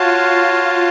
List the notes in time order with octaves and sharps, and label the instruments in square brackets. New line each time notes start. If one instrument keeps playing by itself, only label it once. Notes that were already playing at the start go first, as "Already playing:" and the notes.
Already playing: [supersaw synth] F4 [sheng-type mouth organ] F#4 C#5 F5 A5